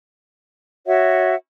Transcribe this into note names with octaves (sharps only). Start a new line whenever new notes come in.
F#4 C#5 E5 F#5